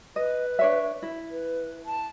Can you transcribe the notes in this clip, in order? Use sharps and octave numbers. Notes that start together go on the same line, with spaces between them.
B4 D#5
D4 C#5 E5
E4
B4
A5